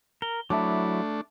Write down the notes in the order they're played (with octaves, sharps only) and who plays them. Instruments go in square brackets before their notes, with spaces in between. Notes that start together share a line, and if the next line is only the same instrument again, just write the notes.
[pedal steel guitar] A#4 [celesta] G7
[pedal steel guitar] F#3 E4 [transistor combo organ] A3 D4 [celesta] E5 A5 D6